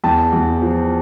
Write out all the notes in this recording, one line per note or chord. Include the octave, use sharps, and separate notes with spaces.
E2 G5 A5
E2
F3